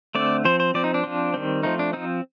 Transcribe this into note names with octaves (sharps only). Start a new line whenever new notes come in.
D3 A3 C4 D5
F3 C4 C5
C5
F3 C4 D5
D#4
D4
F3 C4
D#3 G3 C4
F3 A3 C4 D#4
D4
F3 C4 D#4